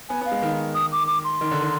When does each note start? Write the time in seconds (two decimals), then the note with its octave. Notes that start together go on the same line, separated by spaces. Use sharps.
0.09 B3 G#5
0.21 B3 F5
0.32 G#3
0.42 D#3
0.75 D#6
0.92 D6
1.07 D6
1.24 C6
1.41 D#3
1.51 D3
1.62 D#3